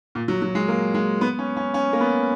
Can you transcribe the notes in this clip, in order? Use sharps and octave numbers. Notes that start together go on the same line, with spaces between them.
A#2
F#3
F#3
G#3
A#3
G#3
B3
C#4
C#4
C#4
A#3
B3